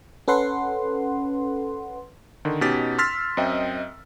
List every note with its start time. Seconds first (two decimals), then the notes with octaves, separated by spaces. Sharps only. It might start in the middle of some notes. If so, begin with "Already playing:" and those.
0.28 C#4 A4 B4 F#5 C6
2.45 D3 D#3
2.61 B2 C#4 D#4 G4 A6 B6
2.98 C6 E6 F6 A6 B6
3.37 F#2 C4 D#5 E5 G5